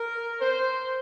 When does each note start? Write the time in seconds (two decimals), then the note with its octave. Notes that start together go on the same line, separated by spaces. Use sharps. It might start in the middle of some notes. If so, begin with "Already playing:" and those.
Already playing: A#4
0.40 C5